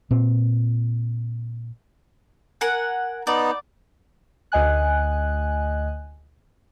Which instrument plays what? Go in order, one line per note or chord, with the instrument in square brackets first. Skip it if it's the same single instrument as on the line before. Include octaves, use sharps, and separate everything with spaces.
[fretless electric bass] A#2 C4
[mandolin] A#4 F#5 G#5
[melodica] B3 D#4 [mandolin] D5
[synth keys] D2 D#5 G#5 F#6